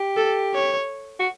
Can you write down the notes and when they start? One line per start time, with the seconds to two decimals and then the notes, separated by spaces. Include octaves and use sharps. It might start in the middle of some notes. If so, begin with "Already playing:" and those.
Already playing: G4
0.17 A4
0.55 C#5
1.19 F#4